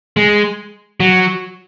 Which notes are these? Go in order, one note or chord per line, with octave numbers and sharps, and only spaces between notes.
G#3
F#3